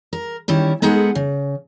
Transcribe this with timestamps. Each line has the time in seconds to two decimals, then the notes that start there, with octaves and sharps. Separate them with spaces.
0.13 A#4
0.48 D#3 G3 C#4 E4
0.82 G#3 B3 D#4 G#4 A4 F#5
1.15 C#3